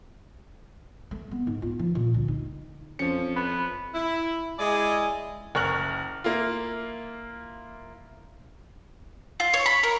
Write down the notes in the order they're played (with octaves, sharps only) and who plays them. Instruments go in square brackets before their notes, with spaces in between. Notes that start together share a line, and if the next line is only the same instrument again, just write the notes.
[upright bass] A3
B3
G#2
F4
F3
A#2
D2
D#4
[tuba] F2 [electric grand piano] F3 C#7 [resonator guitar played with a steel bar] C#4
[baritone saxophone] B3
[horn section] E4
G#3 E4 G#4 D5 D#5 G#5
[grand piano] F#1 A#4 C#6 F6 F#6 F#7
A#3 E4 F4
[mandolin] F4
C#5
B5
A#4